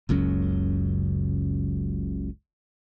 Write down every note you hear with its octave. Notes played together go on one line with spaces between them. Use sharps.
F#1 C#2 F#2 C#4